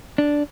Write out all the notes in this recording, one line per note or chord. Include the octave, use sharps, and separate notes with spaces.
D4